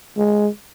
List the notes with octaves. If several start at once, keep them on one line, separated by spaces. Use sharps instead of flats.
G#3